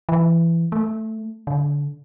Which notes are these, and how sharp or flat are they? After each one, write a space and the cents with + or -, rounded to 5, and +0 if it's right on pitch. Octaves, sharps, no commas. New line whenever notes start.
E3 +20
A3 +5
D3 -20